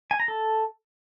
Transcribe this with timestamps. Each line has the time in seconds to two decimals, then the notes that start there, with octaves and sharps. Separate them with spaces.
0.11 G#5
0.20 A#5
0.28 A4